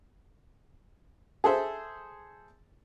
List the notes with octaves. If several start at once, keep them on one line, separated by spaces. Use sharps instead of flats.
G#4 A4 C5 E5